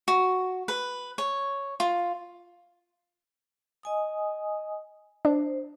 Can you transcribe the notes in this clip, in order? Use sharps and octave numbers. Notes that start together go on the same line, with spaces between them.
F#4
B4
C#5
F4
D#5 G#5 D#6
D4 C5